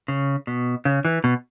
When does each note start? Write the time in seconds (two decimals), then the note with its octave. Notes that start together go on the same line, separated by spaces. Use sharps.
0.08 C#3
0.47 B2
0.85 C#3
1.05 E3
1.24 B2